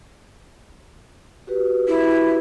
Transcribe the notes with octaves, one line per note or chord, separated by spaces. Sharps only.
F#4 G4 B4
E4